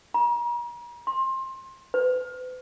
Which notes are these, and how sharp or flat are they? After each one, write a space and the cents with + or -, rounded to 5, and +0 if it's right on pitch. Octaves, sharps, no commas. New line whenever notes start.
A#5 +40
C6 +25
B4 +40